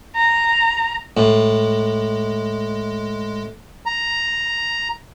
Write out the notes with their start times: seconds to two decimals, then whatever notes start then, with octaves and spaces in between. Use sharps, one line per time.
0.16 A#5
1.17 A2 G#3
3.86 A#5